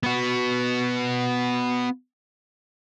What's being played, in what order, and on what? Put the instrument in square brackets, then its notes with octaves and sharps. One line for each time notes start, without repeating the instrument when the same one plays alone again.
[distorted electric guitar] B3 F#4